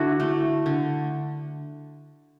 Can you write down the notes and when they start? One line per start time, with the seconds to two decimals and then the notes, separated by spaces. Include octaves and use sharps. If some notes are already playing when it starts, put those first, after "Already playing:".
Already playing: D3 D4 E4 F#4
0.20 A3
0.66 D3